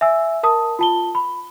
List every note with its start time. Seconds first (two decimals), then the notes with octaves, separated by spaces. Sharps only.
0.01 E5 G#5 E6
0.43 A#4 A5 D#6
0.79 F4 A5 G7
1.15 B5